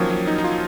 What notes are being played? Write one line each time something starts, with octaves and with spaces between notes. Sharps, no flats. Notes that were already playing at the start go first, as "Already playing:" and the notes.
Already playing: D#3 F3 F#3 A#3 C#4
F#3
D#4
D#4
F4